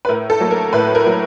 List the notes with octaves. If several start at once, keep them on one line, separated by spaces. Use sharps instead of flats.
B4
A2 A#4
A4
F#3 A#3
A#4
A2 B4
A#4
F#3 A#3